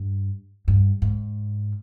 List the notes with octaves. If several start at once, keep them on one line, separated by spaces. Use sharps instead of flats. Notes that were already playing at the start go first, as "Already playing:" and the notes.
Already playing: G2
G2
G#2